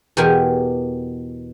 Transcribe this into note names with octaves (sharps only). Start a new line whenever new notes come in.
E2 B2 G4 A#4 G#5